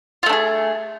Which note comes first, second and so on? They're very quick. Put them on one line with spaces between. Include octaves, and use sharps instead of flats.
F4 A3 D4 G#4